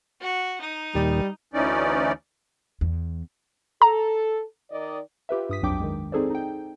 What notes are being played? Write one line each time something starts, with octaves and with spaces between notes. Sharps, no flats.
F#4
D#4
D#2 A#2 D#3 G3
D2 E3 C#4 D#4 D5
E2
A4 A#5
D#3 D5 D#5
F4 G4 B4 E5
G2 D#6 B6
B1 F2 F#3 D4 G5 D6
D#3 G#3
C4 D#4 G#4 A4 C5 D5
D#4 G5